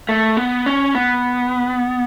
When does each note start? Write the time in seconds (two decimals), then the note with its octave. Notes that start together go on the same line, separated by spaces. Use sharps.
0.09 A3
0.37 B3
0.66 C#4
0.95 B3